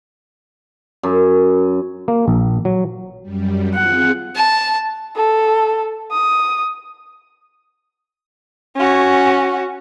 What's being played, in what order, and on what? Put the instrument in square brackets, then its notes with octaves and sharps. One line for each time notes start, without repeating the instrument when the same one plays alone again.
[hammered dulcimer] F#2
[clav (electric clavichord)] A#3
A#1
F#3
[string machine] F#2 G3
[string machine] C4 F4 G#4 [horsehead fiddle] F#5
[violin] A5
[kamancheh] A4
D#6
C#4 F#4